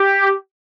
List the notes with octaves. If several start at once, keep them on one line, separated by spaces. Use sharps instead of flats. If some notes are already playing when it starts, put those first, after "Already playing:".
Already playing: G4